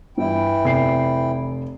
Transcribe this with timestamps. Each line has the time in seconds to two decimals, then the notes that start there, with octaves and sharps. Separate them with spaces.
0.18 G2 E3 E4 E5 G5
0.64 F1 B5 C7